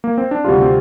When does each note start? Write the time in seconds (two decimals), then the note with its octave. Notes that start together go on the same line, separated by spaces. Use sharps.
0.04 A#3
0.18 C4
0.31 D4
0.44 D2 C3 G3 F4
0.62 C4